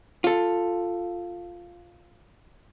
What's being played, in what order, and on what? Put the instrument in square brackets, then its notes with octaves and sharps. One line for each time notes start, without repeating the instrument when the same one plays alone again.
[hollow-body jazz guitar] F4 A4